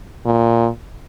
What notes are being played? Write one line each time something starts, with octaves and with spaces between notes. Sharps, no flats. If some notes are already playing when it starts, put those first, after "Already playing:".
A#2